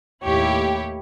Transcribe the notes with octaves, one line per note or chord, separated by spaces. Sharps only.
D#2 A2 E4 G4 C#5